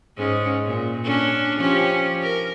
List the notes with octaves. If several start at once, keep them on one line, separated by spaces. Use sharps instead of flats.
G#2 G#3 C#4
A#2
C#4 D4
F3 C#4 G4
A#4